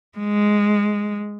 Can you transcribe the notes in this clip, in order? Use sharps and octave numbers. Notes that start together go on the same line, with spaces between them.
G#3